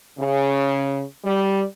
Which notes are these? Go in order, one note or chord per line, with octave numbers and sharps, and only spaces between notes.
C#3
G3